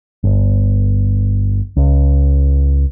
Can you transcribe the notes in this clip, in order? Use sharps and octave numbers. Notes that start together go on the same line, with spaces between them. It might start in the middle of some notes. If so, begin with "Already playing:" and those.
G1
C#2